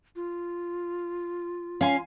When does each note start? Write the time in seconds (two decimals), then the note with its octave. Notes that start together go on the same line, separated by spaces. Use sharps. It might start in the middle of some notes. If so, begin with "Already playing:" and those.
0.16 F4
1.81 C#4 F5 G#5 C6